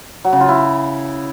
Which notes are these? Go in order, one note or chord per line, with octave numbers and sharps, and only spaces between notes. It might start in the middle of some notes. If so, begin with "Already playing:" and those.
F#3
C#3
F4
E4